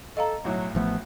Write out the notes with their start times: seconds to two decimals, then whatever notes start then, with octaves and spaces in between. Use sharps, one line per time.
0.17 A4 D#5 F5 A#5
0.44 B1 A2 F#3 E4
0.75 A1 F3 A3 B3